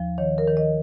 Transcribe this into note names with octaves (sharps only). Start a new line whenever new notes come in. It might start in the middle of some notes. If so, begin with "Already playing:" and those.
Already playing: D#2 F3
D#3 C#5
A#4
D#3
D#5